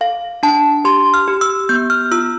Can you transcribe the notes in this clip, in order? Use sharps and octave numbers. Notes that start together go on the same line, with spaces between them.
A4 F5
D4 A5
G4 C6
F6
G4
E6
B3 G6
F6
F4 E6